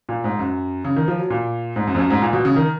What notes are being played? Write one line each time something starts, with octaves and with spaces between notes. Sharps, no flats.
A#2
G#2
F#2
C#3
D#3
F3
F#3
A#2
G#2
F#2
F2
F#2
G#2
A#2
B2
C#3
D#3